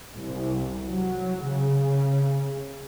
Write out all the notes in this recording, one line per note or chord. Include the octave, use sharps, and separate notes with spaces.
C2
F#3
C#3